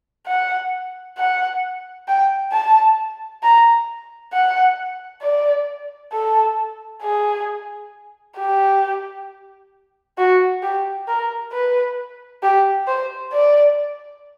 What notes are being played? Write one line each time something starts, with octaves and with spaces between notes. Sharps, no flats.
F#5
F#5
G5
A5
A#5
F#5
D5
A4
G#4
G4
F#4
G4
A#4
B4
G4
C5
D5